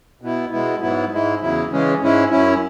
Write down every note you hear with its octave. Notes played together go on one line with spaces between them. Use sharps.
B2 B3 E4
B2 G#3 B3 E4
G#2 F#3 B3 E4
G#2 G#3 E4
E2 C#3 F#3 E4
C#3 E3 G#3 C#4
G#2 G#3 C#4 E4
F#2 F#3 C#4 E4